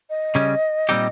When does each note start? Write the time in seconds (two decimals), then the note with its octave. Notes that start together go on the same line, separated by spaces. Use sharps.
0.10 D#5
0.35 C#3 G3 C#4
0.89 A#2 G3 C4 D#4 G4